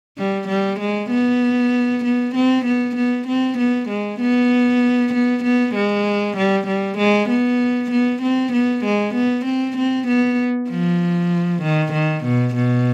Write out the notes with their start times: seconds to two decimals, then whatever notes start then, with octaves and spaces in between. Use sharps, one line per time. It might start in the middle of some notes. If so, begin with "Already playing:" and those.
0.17 G3
0.48 G3
0.80 G#3
1.10 B3
2.04 B3
2.35 C4
2.66 B3
2.96 B3
3.28 C4
3.58 B3
3.89 G#3
4.20 B3
5.14 B3
5.44 B3
5.75 G#3
6.37 G3
6.67 G3
6.98 G#3
7.29 B3
7.91 B3
8.22 C4
8.53 B3
8.84 G#3
9.14 B3
9.45 C4
9.77 C4
10.08 B3
10.69 F3
11.62 D#3
11.93 D#3
12.24 B2
12.55 B2